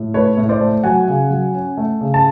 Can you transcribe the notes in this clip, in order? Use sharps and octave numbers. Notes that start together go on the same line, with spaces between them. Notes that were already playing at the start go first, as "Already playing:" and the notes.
Already playing: A2
A3 B4 C#5
A2
C5 D5
A3
F#3 F#5 G#5
C#3
F#3
C#4
A3
C#3
A5